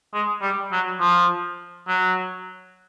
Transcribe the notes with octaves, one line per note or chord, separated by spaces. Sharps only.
G#3
G3
F#3
F3
F#3